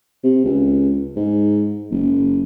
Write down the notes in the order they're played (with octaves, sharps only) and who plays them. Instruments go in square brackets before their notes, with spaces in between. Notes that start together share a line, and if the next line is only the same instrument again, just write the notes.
[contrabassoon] C3
C#2
G#2
F#1